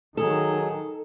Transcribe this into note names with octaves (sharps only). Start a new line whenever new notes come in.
D#3 F#3 G#4 A4